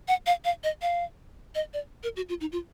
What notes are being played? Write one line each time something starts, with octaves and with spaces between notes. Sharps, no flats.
F#5
F5
F5
D#5
F5
D#5
D5
A#4
F#4
F4
D#4
F4